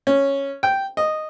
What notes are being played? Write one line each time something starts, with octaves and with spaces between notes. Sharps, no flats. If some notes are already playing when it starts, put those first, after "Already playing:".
C#4
G5
D#5